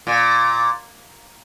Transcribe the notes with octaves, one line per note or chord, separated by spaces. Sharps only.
A#2